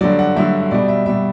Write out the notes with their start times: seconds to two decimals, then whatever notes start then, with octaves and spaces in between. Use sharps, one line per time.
0.01 G2 D3 F#3 D5
0.19 F#5
0.36 G2 D3 F#3 E5
0.71 B2 G3 D5
0.88 E5
1.06 B2 G3 E5